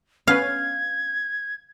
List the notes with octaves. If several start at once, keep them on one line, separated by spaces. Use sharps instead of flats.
B3 C#4 B4 F5 G#6